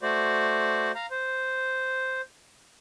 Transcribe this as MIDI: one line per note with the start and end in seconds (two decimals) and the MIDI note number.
0.02 0.92 57
0.02 0.92 66
0.02 0.92 72
0.02 0.92 74
0.95 1.06 77
0.95 1.06 82
1.11 2.21 72